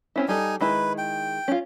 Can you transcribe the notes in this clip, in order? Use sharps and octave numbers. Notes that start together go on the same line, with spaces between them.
C4 C#4 E4
G3 D#4 A4 G#5
D#3 G#3 E4 B4
G5
C#4 F4